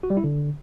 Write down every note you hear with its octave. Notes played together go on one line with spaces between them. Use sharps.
F#4
G3
E4
D3